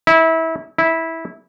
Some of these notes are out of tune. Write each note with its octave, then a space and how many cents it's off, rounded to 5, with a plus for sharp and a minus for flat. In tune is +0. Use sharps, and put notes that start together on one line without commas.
E4 -25
E4 -15